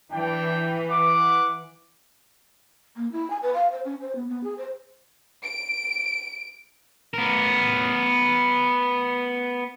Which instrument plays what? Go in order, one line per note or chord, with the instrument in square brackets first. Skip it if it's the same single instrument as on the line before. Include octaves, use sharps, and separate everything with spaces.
[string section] E3 [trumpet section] D4 G5
[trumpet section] F#5 D6
[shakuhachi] A#3
E4
G#5
B4
F5
C5
C#4
C5
B3
B3
G#4
C5
[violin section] D7
[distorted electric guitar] B3 A#4